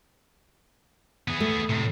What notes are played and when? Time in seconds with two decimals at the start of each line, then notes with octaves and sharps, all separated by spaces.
1.28 B3 G#4
1.40 A3
1.70 A2 C3